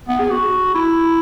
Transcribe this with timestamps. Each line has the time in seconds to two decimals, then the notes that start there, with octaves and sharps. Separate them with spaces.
0.08 B3
0.20 G#4
0.30 F#4
0.74 E4